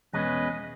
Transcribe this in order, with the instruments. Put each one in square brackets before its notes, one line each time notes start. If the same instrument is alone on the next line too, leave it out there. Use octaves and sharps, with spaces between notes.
[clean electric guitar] E2 B2 G#3 C#4 [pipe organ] B4 D#5